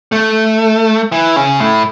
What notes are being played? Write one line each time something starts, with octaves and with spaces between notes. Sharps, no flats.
A3
E3
C#3
A2